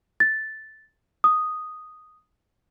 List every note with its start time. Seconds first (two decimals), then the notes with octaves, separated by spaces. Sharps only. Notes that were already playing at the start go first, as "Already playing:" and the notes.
0.20 A6
1.24 D#6